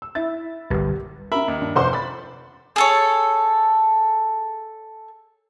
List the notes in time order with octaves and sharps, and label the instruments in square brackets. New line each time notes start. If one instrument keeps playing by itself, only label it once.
[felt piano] E6
E4 E5 A6
[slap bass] G1 C2 [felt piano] G4 A#4 B4
[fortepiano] A#4 E5 B5
D#2
[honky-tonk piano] G2
[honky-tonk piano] F1 C5 C6 [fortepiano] F#5 D6
[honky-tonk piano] B5 A6
[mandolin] G#4 A4 C#5